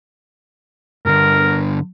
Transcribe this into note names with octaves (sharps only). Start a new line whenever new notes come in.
G2 D3 A#4